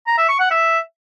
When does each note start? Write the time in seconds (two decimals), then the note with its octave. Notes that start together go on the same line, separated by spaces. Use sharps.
0.07 A#5
0.18 E5
0.29 C#6
0.40 F#5
0.51 E5